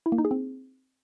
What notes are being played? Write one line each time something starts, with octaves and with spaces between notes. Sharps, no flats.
E4
A#3
D#4
G#4
C4